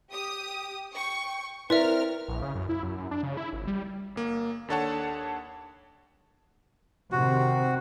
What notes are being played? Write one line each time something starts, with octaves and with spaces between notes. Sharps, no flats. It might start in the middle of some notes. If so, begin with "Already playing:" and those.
G4 D#6
G5 C#6
C4 E4 A#4 B4 D5 E5 F6
A#1
C#3
F#2
E4
F#2
F#2
D4
C#3
E4
G#1
G3
G1 A#3
D#2 D4 A4 C#5 F#5 A5
C3 D#3 C4 F#4